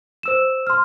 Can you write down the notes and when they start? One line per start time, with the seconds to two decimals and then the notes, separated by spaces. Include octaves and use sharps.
0.23 C5 E6 E7
0.67 C6 F6